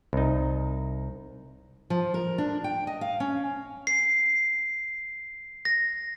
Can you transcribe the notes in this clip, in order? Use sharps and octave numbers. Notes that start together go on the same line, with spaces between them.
C2 D#4
F3
A#4
D4
G5
D#5
F5
C#4
C7
A#6